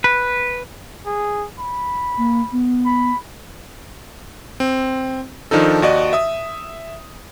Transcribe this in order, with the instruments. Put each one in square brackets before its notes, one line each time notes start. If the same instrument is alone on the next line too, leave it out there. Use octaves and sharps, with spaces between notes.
[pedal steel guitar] B4
[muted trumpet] G#4
B5
[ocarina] A#3
B3
[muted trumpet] B5
[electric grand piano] C4
D#3 F3 D4 D#4 A4
D#2 F#4 D5 D#5
E5 D#6